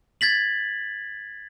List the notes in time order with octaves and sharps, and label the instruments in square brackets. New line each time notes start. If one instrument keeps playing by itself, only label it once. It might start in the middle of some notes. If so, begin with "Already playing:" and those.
[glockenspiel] G#6 A6 B6 F#7